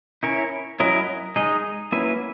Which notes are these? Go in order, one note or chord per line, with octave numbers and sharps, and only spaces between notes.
C#4 E4 A#4 C#5
F#3 C#4 E4 A#4 D#5
G#3 D#4 G#4 D#5
F#3 A#3 C#4 E4 B4